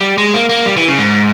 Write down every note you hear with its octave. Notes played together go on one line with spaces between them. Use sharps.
G3
G#3
A#3
A#3
G3
E3
C#3
G#2